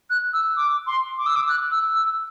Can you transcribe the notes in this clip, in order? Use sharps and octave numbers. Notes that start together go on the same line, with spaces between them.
F#6
E6
D6
C6
D6
E6
D6
F#6
E6
E6